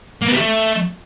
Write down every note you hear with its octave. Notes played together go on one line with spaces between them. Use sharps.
A#3
B3
G3
A3